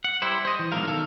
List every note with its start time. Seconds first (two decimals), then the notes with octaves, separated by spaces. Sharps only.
0.04 F#5
0.22 G3 E4 C5
0.45 C5 D#5
0.59 E3
0.72 B1 G#2 D3 A#4 F5
0.87 D#3 A4 F5